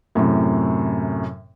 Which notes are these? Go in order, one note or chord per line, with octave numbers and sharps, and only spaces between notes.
F#2 A2 C3